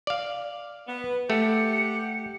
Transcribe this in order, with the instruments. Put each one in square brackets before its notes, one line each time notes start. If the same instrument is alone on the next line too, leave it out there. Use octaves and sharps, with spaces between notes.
[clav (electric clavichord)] D5 F5
[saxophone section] B3
[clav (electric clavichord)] A3 [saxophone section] G4 F#5 [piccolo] C#7